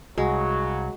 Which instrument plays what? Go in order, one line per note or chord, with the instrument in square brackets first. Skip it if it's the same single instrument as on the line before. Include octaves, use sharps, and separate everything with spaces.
[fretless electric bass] C2 [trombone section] C#3 F#3 [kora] G#3 [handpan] F#4